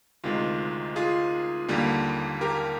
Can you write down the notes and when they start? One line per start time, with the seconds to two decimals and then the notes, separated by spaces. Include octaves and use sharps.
0.24 D2 C3 D#3 G#3 F4
0.96 F4 G#4
1.68 D#2 D3 G3 A#3
2.41 G4 A#4